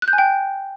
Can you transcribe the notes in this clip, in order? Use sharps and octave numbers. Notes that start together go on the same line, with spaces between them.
F#6
G6
G#5
G5